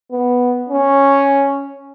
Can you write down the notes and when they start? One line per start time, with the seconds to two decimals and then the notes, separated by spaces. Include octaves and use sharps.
0.11 B3
0.69 C#4